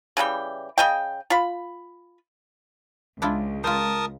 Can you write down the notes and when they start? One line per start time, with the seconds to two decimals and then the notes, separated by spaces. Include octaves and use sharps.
0.17 C#3 E3 G3 G5
0.78 C#3 D#5 G5
1.30 F4 B5
3.22 C#2 D4 E4 F4
3.64 F4 A#4 C5 A5 D#6